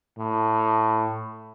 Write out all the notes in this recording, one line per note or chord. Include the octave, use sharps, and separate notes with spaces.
A2